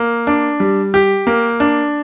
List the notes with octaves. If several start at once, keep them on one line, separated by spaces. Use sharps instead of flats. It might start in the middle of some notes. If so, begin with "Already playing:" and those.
Already playing: A#3
D4
G3
G4
A#3
D4